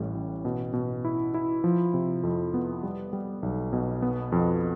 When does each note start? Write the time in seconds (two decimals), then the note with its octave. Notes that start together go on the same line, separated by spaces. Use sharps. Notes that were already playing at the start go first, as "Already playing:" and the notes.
Already playing: A1 A2 G3
0.15 A1
0.45 B2
0.73 B2
1.05 E4
1.34 E4
1.64 F3
1.94 C3
2.23 F2
2.54 B3
2.83 G3
3.13 G3
3.43 B1
3.73 B2
4.02 B3
4.32 F2